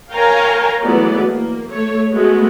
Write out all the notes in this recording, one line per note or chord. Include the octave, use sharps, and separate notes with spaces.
A#4 C#5 F5 G5 G#5 A#5
E3 F#3 G#3 A3 B3 D5
A#3
A3 C#5
G#3 A3 B3 F#4